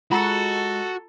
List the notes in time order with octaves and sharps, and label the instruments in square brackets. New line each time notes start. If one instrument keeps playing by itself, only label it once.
[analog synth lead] G#3 [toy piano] F4 A#5 [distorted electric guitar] F#4 [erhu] A4